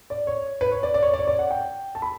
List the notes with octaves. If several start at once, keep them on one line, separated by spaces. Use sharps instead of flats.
D5
C#5
B4
C#5
D5
D5
C#5
D5
C#5
D5
F#5
G5
A5
B5